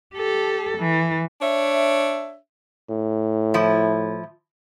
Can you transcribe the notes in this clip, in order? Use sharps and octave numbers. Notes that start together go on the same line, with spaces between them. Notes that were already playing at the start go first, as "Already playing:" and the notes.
G4 A4
E3
D4 C#5 E5
A2
F3 E4